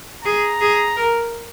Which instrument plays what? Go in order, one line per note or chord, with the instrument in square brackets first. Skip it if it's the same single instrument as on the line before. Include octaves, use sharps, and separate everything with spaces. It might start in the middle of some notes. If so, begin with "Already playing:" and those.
[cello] G#4 [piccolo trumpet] A#5
[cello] G#4
A#4